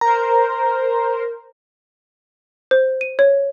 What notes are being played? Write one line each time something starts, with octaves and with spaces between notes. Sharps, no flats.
A#4 C5 A#5
C5
D#7
C#5